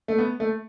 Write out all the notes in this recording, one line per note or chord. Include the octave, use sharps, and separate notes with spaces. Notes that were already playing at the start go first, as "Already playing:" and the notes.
A3
B3
A3